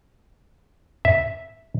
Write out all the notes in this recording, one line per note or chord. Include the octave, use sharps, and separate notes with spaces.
E5